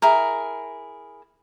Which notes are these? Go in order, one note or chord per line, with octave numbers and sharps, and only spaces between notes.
E4 G#4 A#4